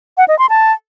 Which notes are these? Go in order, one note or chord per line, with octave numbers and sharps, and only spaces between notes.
F#5
D#5
C6
A5